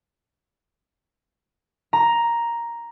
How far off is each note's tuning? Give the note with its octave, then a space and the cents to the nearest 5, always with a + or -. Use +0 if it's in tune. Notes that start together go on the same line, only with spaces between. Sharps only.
A#5 +5